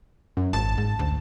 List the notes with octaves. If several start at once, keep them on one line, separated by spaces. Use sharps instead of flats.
F#2
G#1 A5
G#2
D2